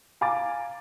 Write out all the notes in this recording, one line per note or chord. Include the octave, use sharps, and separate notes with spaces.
F5 G#5 A#5 D6 A6